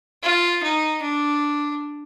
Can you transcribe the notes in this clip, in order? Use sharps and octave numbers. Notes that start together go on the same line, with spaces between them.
F4
D#4
D4